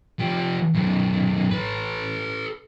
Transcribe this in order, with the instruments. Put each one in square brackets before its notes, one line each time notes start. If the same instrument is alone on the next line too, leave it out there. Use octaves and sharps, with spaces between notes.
[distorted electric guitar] F3 G4
F#2 D#3
A4 B4